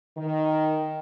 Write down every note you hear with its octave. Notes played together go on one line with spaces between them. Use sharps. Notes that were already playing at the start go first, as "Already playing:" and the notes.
D#3